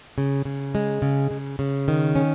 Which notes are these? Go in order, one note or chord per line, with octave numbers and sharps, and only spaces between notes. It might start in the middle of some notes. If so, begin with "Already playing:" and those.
C#3
C#3
G#3
C#3
C#3
C#3
D#3
C#4